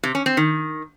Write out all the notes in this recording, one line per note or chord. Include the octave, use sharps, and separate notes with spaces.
C3
C#4
C4
D#3